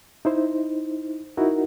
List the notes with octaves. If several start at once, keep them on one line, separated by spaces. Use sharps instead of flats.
D#4 E4 C5
D#4 E4 F#4 A#4